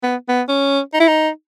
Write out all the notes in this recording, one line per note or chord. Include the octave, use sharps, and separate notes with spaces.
B3
B3
C#4
D#4
E4
D#4